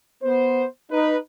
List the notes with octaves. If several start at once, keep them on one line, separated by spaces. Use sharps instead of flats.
B3 C5
D#4 B4